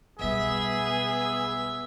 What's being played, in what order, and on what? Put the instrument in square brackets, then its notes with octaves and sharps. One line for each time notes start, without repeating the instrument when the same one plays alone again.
[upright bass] B1 G3 [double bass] B3 [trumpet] G#4 [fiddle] E5